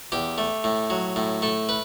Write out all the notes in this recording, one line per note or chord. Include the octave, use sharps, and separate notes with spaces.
E2 G4
A3
A2
F#3
A2
A3 A4
B4